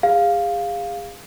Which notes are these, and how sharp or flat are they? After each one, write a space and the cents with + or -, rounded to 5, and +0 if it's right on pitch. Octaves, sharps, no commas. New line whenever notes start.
G#4 -35 F5 +0